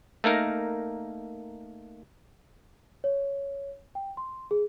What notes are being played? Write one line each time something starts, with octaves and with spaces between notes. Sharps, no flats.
A3 A#3 D#4 A#4
C#5
G5
C6
G#4